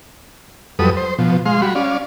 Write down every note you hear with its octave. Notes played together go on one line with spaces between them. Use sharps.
F2 F#3 G3 A4 B4 D#6
C5
B2 F3
G#3 F5 C6
G3 F#4 B5
C#4 D5 F5